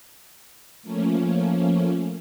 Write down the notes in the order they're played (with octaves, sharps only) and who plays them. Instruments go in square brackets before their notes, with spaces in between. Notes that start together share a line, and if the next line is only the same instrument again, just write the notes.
[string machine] F3 A3 A#3 C#4